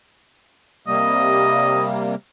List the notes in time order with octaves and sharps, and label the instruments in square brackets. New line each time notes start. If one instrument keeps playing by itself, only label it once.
[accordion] C3 G3 A#3 [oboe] D#5